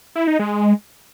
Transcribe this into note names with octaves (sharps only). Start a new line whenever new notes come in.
E4
D#4
G#3